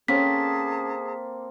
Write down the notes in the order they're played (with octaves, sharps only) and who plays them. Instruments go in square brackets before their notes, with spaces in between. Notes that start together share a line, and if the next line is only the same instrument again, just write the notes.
[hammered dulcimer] A#3 C4 A4 [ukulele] C#4 [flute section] G#4 A5 D#6 [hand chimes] B6